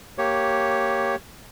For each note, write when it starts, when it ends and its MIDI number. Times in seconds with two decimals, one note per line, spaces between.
0.18 1.15 58
0.18 1.15 67
0.18 1.15 73